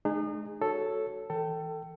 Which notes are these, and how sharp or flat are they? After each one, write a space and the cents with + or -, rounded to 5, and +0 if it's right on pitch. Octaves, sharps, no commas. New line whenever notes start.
G#3 +45 D#4 -35 G#4 -25
F#4 +0 A4 +0 C#5 +0
E3 -30 A4 +20 G5 -15